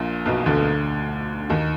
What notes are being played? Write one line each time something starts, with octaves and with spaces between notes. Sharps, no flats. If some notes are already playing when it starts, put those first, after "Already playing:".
Already playing: A#1 A#2
B1 B2
D2 D3
D#2 D#3